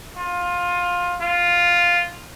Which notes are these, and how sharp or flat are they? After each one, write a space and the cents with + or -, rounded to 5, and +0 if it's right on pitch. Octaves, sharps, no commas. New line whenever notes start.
F4 +20
F4 +0